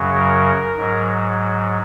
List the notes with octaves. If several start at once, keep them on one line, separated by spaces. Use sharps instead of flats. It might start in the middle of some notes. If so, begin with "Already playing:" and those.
Already playing: F#2 C#3 F#3
A#4
G#2 F#3